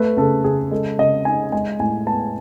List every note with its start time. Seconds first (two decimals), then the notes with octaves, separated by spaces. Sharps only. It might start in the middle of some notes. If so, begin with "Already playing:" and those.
Already playing: A3 B4
0.17 C#3 A4
0.44 C#3 G#4
0.71 G#3 A4
0.98 C#3 D#5
1.25 D#4 G#5
1.52 G#3 G#5
1.79 A2 G#5
2.07 B3 A5